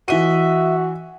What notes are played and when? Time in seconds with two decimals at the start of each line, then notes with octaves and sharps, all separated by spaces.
0.08 E3 F#4 D#5 E5 D#7